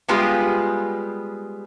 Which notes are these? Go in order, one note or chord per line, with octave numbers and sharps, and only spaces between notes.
G3 G#3 B3 F4 G4 G#4